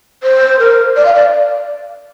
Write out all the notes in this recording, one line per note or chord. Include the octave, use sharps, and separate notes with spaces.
C5
A#4
D5
F5
D5